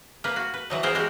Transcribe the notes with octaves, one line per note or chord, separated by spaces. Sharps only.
A#3 B4
F#4
B4
E3 F#3 D#4
B3 E4 G#4 A#4 C5 A#5
G#3 F#4 G4 A#4